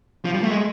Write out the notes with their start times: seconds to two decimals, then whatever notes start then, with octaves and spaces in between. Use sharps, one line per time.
0.25 F3
0.35 G3
0.43 A3
0.51 G#3